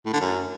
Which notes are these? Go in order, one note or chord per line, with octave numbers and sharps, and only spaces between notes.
A2
D3
F#2